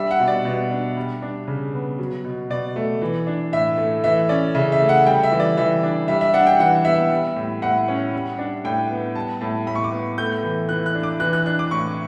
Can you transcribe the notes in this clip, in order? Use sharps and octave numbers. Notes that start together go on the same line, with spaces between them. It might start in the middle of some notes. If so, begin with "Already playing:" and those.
Already playing: G3 D4 E5
F#5
B2
D5
B2
D4
G3
D4
C#3
B3
F#3
B2
B2 D5
A3
E3
D4
A2 E5
A3
E3 E5
C#4 D5
C#3 E5
E5
A3
F#5
G3 G5
E5
E3
D5
E3 E5
D4
G3 E5
E5
D4 F#5
G5
E3 F#5
B3 E5
G3
A2
A2 F#5
C#4
G3
D4
A2 G5
B3
G3 A5
A2 A5
A2 B5
C#6
D6
B3
A3 G6
E3
E3 F#6
F#6
D4
D6
E3 F#6
F#6
D4 F#6
D6
A2 C#6